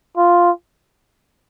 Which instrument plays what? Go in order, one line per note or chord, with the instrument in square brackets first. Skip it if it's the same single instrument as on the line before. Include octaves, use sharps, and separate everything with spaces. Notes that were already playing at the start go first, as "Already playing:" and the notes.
[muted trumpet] F4